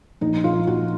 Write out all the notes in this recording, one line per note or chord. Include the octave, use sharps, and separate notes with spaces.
A#1 D#4
A#1 F4
A#1 F#4